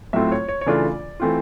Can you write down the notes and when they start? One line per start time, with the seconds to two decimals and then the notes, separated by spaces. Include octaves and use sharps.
0.13 A2 F#3 A3 C4 F4 E5
0.32 C#5
0.48 C#5
0.61 C#5
0.66 C#3 E3 A3 D4 F4 D5
1.20 E3 A3 C4 F4